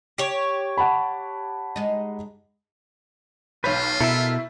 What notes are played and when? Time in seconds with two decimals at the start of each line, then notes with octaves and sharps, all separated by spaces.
0.18 G4 C#5
0.77 F#5 A5 B5
1.76 G#3 D#4
3.64 B1 F4 B4 C#5 G6
4.01 B2 E4 A4 A#4 E5